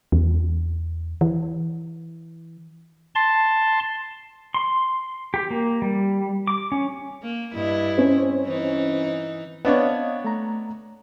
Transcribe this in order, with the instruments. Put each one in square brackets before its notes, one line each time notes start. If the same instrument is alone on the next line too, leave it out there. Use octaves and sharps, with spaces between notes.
[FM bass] E2
E3
[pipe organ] A5 C6
[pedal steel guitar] C6
G4
A#3
G3
D6
C#4
[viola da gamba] A#3
G2 E4 D#5
[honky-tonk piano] C4 C#4
[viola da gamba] E3 D#4
[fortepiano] B3 D4 C#5 [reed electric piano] C4 D#5 F5
[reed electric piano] A3 A#5